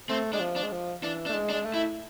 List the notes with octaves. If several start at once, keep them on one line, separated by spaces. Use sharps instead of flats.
A3 C4
G#3 D4
F3
D4
G#3
F3
E3 D4
D4
A3
G#3
D4
G#3
A3
E4